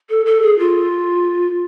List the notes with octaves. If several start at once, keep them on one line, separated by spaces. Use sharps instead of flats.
A4
A4
G#4
F4